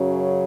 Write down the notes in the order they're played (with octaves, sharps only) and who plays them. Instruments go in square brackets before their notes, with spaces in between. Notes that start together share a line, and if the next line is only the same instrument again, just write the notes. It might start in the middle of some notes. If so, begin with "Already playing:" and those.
Already playing: [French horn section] F#2 C#3 F#3